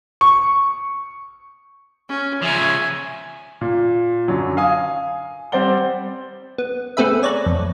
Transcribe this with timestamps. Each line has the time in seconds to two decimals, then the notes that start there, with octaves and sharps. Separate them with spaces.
0.21 C#6
2.09 C#4
2.42 C#3 F3 E5 G#5
3.61 A#2
4.28 F#2 D3 F#3
4.57 F5 G#5 D#6
5.52 G3 C4 C5 D5 F#5 G7
6.58 B3
6.97 A3 B3 C4 G#4 B4 E5
7.23 C#5 D5 A#5 F#6
7.46 F2